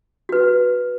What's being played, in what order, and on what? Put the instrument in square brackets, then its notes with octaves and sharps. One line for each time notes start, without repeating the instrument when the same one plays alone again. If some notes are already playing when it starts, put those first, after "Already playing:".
[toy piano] F#4 B4